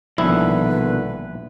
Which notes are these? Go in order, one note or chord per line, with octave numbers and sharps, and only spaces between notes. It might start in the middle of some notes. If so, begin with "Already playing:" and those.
A#1 B2 D3 D#3 F3 G3 E4 B4